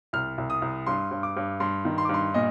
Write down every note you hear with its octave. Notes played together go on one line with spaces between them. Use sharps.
C2 F6
C2
D#6
C2
G2 C6
G2
D6
G2
G2 C6
D#3
C6
D6
G2 C6
A#2 D#5